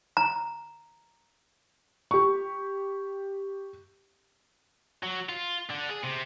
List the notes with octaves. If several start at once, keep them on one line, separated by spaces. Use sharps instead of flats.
A#5
G4 C#6
F#3
F4
D3
G#4
C3